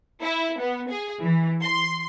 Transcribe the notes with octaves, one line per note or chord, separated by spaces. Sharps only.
E4
B3
G#4
E3
C6